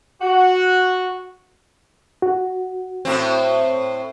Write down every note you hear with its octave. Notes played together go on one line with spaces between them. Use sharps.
F#4
F#4
A2 C4